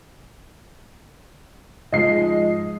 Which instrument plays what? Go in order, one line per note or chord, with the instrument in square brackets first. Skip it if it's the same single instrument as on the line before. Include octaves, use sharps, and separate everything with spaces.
[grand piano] G#2 F3 G#3 [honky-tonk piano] D#5 C7